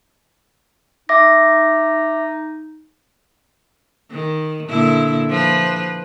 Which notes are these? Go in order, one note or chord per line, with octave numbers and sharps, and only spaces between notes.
D#4 E5 D6 A#6
D#3
A#2 D3 E4
F3 B4